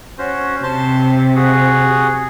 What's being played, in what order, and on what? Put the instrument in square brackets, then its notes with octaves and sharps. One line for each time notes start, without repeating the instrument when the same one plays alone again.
[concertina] C#4 F#4 C5
[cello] C3 [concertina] C5 A5 C6
[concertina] F#4 G#4